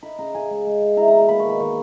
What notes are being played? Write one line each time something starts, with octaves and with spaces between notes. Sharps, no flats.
D#4 B5
C#3 A#5
C#3 G#5
G#3
G#3
G#3
E4 A#5
A#5
B2
A#5
A#3 B5
C#6
D#3
B5
D#3 C#6